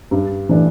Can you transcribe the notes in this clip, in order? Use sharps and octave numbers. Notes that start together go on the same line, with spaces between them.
G2
E3 A3 D4